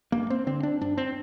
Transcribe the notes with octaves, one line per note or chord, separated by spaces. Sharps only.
G2 A#3
C4
D3 C4
D4
G2 D4
C4